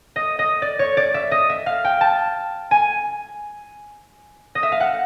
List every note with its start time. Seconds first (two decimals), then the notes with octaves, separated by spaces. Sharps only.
0.16 D#5
0.39 D#5
0.62 D5
0.79 C#5
0.97 D5
1.14 E5
1.31 D#5
1.50 E5
1.66 F5
1.84 G5
2.01 A5
2.71 G#5
4.55 D#5
4.63 E5
4.72 F5
4.80 F#5